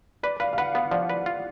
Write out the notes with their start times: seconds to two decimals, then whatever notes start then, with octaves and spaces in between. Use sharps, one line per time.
0.23 B4 D5
0.40 B4 F5
0.53 F5
0.58 B4 F#5
0.74 B3 F5
0.91 F3 D5
1.10 B4
1.26 F4